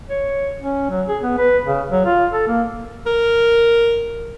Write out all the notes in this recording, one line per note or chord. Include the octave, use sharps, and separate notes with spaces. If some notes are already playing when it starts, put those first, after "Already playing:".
C#5
C#4
F#3
G#4
B3
B4
C#3
F#3
F4
A4
A#3
A#4